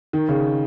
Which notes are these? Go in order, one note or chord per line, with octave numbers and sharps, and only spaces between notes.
D#3
C#3